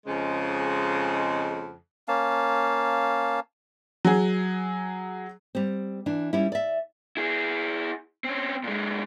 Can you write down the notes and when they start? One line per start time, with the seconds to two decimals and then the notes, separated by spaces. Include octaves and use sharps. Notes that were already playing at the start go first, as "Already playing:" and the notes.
0.06 F2 C#3 G#3
2.08 A#3 C#4 F5 A5
4.05 F#3 G#4
5.55 G3 C4
6.06 E3 D4
6.33 G3 C#4 E4
6.52 D5 E5
7.17 E4 G#4
8.24 C4 C#4
8.64 A#2 G#3